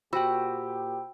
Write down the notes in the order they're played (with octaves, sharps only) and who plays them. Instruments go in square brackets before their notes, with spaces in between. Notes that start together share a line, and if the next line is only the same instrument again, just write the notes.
[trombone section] A#2 G4 [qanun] F#4 F#5 [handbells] C5 G5 [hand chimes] B5 E6